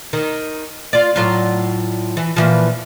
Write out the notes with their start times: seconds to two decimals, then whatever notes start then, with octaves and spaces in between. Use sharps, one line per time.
0.13 D#3
0.93 F4 D5
1.16 A2 F#3 F4
2.17 E3
2.36 A#2 E3 F3